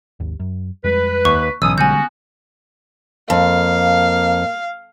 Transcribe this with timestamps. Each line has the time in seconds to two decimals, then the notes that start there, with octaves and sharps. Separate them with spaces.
0.20 G#1 D#2
0.40 F#2
0.84 F2 G3 G#3 B4
1.25 D#2 C#6
1.62 B1 G#2 E3 C#4 D#6 E6
1.78 D3 G3 G#3 B3 C#4 F#4 G#5 G6
3.30 F2 A#3 F5